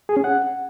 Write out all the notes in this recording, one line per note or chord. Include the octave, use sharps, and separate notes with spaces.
G#4
C#4
F#5